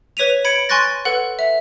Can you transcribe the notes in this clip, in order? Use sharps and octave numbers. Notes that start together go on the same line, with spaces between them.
B4 C#5 B6 D#7 F7
B5 G#6 C#7 D7
G#5 C6 C#6 F#6 A6 A#6
A4 B4 F#5
E5